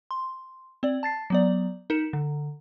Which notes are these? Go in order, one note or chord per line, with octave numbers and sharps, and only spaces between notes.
C6
C4 D5
A5 A6 C7
F#3 B3 D5
D#4 A#4 C#7 E7
D3